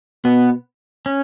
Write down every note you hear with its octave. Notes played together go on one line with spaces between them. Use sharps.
B2 B3
C#4